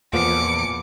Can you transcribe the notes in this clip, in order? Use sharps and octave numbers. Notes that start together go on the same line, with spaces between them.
E2 A#2 F3 B3 D6 C#7